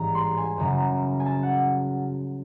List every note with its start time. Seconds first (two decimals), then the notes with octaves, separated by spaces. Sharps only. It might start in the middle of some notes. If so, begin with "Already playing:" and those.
Already playing: A1 G#2 E3 G3 A#5
0.15 C6
0.37 G#5
0.58 F#2 C#3 F#3 A#5
1.20 G#5
1.26 A5
1.43 F#5